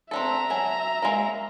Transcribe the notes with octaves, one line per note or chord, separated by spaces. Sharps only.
C4 D4 A4 E5 A#5
F#3 G#5
G#3 A#3